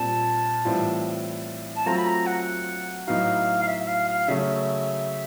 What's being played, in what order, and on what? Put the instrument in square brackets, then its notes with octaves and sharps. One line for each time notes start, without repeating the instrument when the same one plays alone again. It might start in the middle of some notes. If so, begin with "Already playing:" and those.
Already playing: [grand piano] A#2 G3 C4 F4 [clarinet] A5
[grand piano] A2 E3 G3 C4 F4
[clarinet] A5
[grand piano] F#3 A3 C4 F4 A4 [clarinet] A#5
[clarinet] B5
A#5
F#5
[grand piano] A2 F#3 B3 D#4 F#4 [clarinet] F5
[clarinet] F5
E5
F5
F5
[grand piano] C#3 F#3 A3 C#4 [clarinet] E5